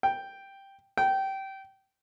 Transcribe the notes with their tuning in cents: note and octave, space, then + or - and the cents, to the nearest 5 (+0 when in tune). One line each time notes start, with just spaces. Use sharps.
G5 +0
G5 -20